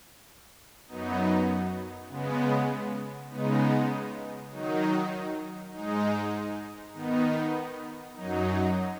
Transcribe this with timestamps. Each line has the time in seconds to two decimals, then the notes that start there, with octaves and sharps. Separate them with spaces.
0.87 F#2 F#3 B3 D#4
2.09 C#3 G#3 B3
3.30 C#3 G#3 B3 D#4
4.51 D#3 F#3 D#4
5.73 G#2 G#3 D#4
6.94 D#3 B3 D#4
8.15 F#2 F#3 D#4